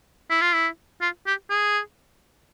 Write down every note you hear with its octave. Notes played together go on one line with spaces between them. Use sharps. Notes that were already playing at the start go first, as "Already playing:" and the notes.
E4
F4
E4
F4
G4
G#4